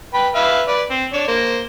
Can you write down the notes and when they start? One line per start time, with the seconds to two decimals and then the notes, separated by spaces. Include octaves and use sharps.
0.14 B4 G5 B5
0.35 B4 E5 F5
0.68 B4 D5
0.90 C4
1.13 D4 C#5
1.28 A#3 C5